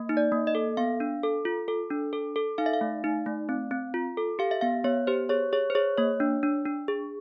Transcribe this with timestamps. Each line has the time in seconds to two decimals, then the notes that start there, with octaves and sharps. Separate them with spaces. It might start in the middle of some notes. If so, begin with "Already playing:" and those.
Already playing: A#3
0.09 D#4
0.17 D5
0.32 A#3
0.47 D#5
0.55 A4
0.77 B3 F5
1.00 D4
1.23 A4
1.45 F4
1.68 A4
1.91 D4
2.13 A4
2.36 A4
2.58 D#4 F5
2.66 E5
2.74 F5
2.81 A3
3.04 D#4
3.26 A3
3.49 C4
3.71 C4
3.94 F4
4.17 A4
4.39 G4 F5
4.51 E5
4.61 B3 F5
4.84 B3 C#5
5.07 G4 C5
5.29 G#4 C#5
5.53 G#4 C#5
5.70 C5
5.75 G#4 C#5
5.98 A#3 C#5
6.20 D4
6.43 D4
6.66 D4
6.88 G#4